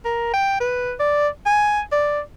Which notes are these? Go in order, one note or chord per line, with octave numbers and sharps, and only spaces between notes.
A#4
G5
B4
D5
G#5
D5